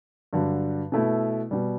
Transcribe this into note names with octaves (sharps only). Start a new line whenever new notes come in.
G2 D3 F#3
B2 A3 E4
B2 G3